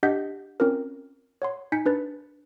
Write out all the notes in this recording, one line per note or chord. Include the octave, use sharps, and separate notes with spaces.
D4 G4 D#5 F#5 G6 B6
C4 C#4 F4 A#4
C#5 F#5 C6
D#4 G#5 G6 B6 C#7
D4 B4 A6